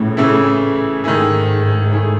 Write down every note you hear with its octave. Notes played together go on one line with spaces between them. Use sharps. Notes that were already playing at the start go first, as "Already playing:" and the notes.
Already playing: A2 C#3 E3 A3
C#3 E3 A3 E4
G#2 D#3 A3 E4 G#4
D#3 A3 E4 G#4